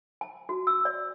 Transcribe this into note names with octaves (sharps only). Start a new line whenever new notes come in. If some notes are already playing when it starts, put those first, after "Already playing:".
A5
F#4
E6
D5